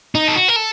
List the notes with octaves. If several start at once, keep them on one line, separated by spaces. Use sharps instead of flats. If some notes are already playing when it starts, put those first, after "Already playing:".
D#4
A4
F#4
A#4
A4